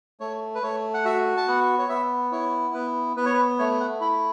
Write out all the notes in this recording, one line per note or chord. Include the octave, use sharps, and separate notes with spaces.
A3 C#5
B4
A3 C#5
F#5
F#4 E5
A5
B3 F#5
C#5
B3 E5
E4 C#5
B3 B4
B3 B4
C#5
B4
A3 C#5
F#5
E4 B5